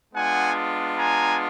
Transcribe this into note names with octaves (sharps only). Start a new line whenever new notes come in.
G#3 B3 D4 F4 F#5 G#5
G#5 A#5